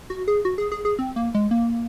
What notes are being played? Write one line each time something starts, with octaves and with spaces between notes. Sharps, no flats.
F#4
G#4
F#4
G#4
G#4
G#4
C4
A#3
G#3
A#3